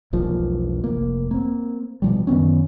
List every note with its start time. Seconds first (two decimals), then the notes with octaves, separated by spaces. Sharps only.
0.13 E1 B1 F3 A#3
0.84 F1 A#3
1.31 A#3 C4
2.02 B2 F3 G3
2.27 F#2 D#3 B3 C#4